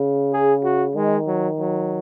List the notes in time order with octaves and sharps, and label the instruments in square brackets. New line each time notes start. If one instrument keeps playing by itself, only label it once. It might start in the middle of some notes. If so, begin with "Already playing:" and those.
Already playing: [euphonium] C#3
[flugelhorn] G#4
F#4
[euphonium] D#3 [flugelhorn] G#3
[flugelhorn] F#3
F#3